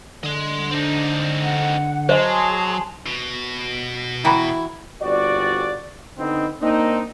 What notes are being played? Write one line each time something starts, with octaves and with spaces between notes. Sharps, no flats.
D3 D#5 C6
C4 D4 D#4
F#5
F#3 G#4 C5 D#5 A5 C6
B2
E3 E4 F#4 G5 A#5 B5
G1 C4 F#4 D5
D3 B3 C4 D#4
A#3 C4 D4 D#4